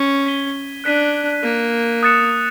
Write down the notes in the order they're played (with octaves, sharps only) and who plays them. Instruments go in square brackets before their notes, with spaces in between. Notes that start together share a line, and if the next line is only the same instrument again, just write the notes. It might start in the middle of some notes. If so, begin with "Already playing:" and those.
Already playing: [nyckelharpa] C#4
[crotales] G#6 B6 D#7 G7
[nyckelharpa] D4 [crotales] F#6 B6 D#7
[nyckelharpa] A#3 [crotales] F#6 B6 D#7
[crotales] D#6 F#6 A6 C#7 E7